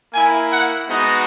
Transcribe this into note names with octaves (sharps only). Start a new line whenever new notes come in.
A#3 E4 G#5
F#5
G#3 B3 D#4 F#4 D#5